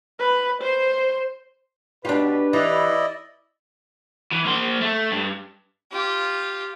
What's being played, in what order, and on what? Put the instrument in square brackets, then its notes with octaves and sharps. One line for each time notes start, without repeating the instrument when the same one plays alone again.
[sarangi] B4
C5
[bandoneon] B2 [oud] D4 F4 [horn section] G4 B4
[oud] E3 [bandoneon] E4 D5 D#5
[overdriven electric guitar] E3
A#3 C5
A3
G2
[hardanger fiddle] F4 G4